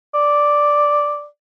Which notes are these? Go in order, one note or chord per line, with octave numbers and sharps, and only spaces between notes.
D5